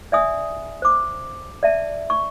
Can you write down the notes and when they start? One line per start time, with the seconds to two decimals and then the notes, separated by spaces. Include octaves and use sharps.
0.12 D5 E5 G#5 D#6
0.82 C5 D6
1.63 D5 E5 A5
2.10 C#6